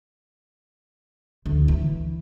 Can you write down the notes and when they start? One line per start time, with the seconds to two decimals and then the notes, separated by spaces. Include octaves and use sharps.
1.46 D2
1.68 E3